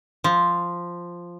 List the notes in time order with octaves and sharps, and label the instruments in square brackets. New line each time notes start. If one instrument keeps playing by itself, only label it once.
[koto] F3